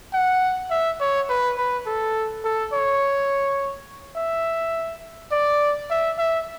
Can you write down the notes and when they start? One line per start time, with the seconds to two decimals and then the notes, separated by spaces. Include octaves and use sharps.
0.13 F#5
0.71 E5
1.00 C#5
1.29 B4
1.58 B4
1.86 A4
2.44 A4
2.73 C#5
4.16 E5
5.31 D5
5.90 E5
6.19 E5